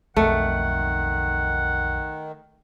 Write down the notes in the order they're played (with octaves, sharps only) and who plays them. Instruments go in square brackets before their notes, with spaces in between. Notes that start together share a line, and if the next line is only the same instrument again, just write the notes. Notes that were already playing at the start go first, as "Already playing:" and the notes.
[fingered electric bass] B1 F2 [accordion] D#3 [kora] A3 [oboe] F#5